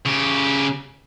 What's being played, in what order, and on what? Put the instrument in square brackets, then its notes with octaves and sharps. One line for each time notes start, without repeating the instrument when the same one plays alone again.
[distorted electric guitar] C#3 G4